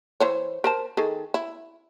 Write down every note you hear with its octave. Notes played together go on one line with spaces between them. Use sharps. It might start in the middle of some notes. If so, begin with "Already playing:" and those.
E3 C5 C#5
A#4 C5 A5
D#3 G#4 A4
E4